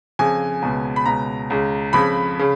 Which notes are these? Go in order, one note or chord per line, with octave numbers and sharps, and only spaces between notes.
F2 C#3 G#5
C#2 B2
B5
C#2 B2 A#5
C#2 C#3
F2 C#3 B5
C#3